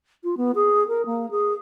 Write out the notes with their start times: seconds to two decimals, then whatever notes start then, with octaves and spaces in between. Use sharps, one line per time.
0.23 F4
0.37 B3
0.55 G#4
0.88 A#4
1.06 A#3
1.31 G#4